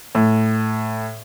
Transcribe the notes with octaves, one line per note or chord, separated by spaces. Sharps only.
A2